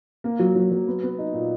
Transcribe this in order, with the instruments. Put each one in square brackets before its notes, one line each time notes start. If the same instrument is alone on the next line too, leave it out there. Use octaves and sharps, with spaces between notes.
[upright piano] A#3
F#3
F#3
F#3
B3
B3
D#4
A#2